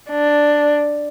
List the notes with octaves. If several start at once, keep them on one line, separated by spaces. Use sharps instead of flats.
D4